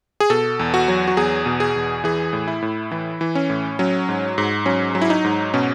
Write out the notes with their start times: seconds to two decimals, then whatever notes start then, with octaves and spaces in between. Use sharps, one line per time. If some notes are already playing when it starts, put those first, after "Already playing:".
0.20 G#4
0.30 B2 A4
0.59 E2
0.74 F#4
0.88 F#3
1.08 F#4
1.17 E2 G#4
1.46 B2
1.60 G#4
1.76 E2
2.04 E3 G#4
2.33 A2
2.48 E4
2.62 A2
2.91 E3 E4
3.21 E3
3.35 C#4
3.50 A2
3.79 F#3 C#4
4.09 G#2
4.38 G#2
4.66 F#3 C#4
4.95 F#3
5.02 E4
5.10 D#4
5.24 G#2
5.54 B2 C#4